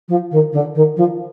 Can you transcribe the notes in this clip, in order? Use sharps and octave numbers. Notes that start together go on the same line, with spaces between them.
F3
D#3
D3
D#3
F3